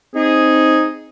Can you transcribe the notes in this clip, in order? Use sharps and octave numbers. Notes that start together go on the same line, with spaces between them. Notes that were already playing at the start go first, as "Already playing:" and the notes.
C4 D#4 G#4